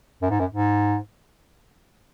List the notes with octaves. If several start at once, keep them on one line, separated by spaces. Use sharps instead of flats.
F#2
G#2
F#2
G#2